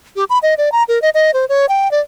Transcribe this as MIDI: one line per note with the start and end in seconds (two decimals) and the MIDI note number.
0.16 0.24 67
0.30 0.38 83
0.43 0.54 75
0.58 0.72 74
0.72 0.83 82
0.88 1.01 70
1.02 1.09 75
1.14 1.31 75
1.34 1.45 72
1.49 1.66 73
1.69 1.90 79
1.91 2.00 74